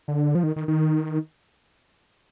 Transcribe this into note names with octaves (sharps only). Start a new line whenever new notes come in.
D3
F3
D#3
D#3
D#3